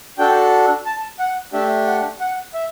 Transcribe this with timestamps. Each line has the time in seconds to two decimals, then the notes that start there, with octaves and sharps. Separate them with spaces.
0.18 D4 F#4 A4 G5
0.86 A5
1.19 F#5
1.53 A3 D4 G4 E5
1.87 F#5
2.21 F#5
2.54 E5